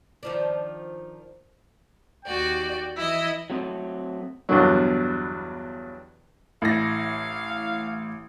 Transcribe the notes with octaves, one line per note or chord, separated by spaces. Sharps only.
D#3 F3 D4
D#2 F#4 D5 G5
E3 E4 D#5 E6
F#3 A3 C4 D#5
E2 G2 B2 D3 F#3
A1 A3 E4 F5 A#6